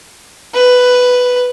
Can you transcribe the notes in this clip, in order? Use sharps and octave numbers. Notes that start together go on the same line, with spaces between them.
B4